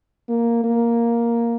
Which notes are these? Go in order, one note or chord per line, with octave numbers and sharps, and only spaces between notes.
A#3
A#3